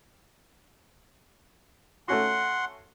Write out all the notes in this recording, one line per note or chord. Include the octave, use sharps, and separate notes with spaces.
A3 C#4 F#4 F#5 C6